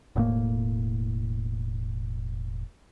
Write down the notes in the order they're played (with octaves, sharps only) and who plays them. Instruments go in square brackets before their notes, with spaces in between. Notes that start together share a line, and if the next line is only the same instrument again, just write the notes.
[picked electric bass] E1 A2 A#3